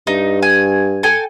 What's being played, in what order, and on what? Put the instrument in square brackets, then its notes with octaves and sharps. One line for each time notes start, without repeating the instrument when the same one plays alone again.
[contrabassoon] G2 [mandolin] D#4
[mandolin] G#5
A4 G5 G#5